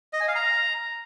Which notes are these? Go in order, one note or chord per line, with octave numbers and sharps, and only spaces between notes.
D#5
G#5
F5
A#5